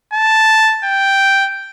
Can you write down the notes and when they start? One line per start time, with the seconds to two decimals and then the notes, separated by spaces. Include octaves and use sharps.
0.13 A5
0.84 G5